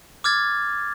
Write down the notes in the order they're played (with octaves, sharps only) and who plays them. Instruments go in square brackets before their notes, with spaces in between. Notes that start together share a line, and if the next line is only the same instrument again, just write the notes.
[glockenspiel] D6 F6 G#6 A6